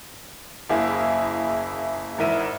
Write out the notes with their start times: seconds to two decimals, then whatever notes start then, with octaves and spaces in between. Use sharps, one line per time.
0.70 F#1 A#3 E4 G#4
2.18 G#1 E3 A#4 E5 D#7